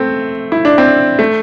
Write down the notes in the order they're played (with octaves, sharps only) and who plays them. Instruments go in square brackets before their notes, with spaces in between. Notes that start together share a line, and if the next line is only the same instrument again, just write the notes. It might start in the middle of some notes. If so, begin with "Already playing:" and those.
Already playing: [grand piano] A3 C4
E4
D4
C4
A3